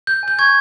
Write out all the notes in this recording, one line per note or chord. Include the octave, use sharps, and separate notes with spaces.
G6
G#5 G6
C#6 G#6